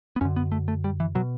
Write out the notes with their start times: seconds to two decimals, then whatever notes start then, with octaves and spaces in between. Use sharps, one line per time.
0.16 B3
0.21 F#2 D3 C#4
0.36 B3
0.52 A3
0.68 A3
0.84 G3
1.00 E3
1.15 B2 F#3